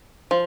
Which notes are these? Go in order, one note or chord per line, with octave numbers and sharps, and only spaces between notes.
F3